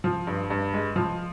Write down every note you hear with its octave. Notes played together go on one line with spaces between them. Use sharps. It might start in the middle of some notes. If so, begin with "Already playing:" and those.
F3
G2
G2
G#3
F3